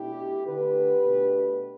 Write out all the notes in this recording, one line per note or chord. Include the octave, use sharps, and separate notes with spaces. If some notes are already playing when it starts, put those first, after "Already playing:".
Already playing: B2 A3 D4 E4 G4
D3 A3 D4 G4 B4
B2 A3 D4